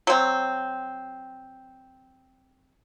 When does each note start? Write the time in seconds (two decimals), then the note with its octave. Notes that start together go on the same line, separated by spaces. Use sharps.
0.07 F#3 C4